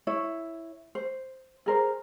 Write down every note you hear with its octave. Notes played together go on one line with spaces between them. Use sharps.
E4 C#5
C5
G#4 A#4 C5